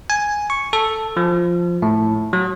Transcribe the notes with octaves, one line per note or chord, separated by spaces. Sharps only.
G#5
C#6
A4
F3
A2
F#3